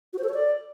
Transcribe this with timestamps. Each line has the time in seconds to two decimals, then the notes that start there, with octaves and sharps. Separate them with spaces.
0.13 F#4
0.18 C5
0.24 A4
0.29 C#5
0.34 D5